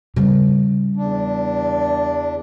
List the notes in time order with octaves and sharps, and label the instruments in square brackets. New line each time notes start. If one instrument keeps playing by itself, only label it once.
[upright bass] C#3 G3
[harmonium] E2 D4